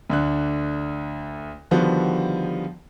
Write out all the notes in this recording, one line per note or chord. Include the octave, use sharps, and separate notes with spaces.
D2 D3 F#6
D3 D#3 F3 G3 B3 F#4